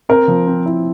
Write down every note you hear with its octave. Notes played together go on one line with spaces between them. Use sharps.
C4 A#4
F3
C4
E4